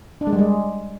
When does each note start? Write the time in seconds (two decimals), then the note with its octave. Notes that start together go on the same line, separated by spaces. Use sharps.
0.21 D4
0.27 G#3
0.33 G3
0.38 G#3